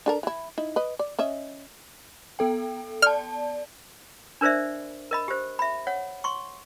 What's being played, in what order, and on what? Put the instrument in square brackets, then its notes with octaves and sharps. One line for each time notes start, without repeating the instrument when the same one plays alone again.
[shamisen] D4 A4 A#4
E3 E4
D#4 E4
B4 D#5
D5
C#4 D#5 E5
[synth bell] B3 A4 G5
[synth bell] D5 A5 [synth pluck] F6
[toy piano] D4 A#4 C5 D5 E5
A#4 D#5 B5
G4 C5
E5 B5
C#5 F#5
C6 C#6